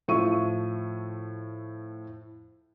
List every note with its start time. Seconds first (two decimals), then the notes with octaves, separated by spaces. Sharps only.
0.08 A2 F3 E5 C#6 D#7